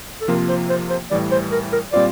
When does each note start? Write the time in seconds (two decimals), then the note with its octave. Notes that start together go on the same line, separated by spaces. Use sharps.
0.21 A4
0.28 C3 F3 A#3 F4 A#4
0.49 C5
0.70 C5
0.90 C5
1.11 A2 E3 G3 D5
1.32 C5
1.52 A#4
1.72 A#4
1.92 A#2 G3 C4 F4 C5 D5